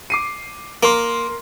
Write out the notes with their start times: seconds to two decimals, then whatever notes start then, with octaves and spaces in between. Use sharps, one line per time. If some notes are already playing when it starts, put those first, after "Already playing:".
0.10 D6 C7 D#7
0.83 A#3 A#4 C6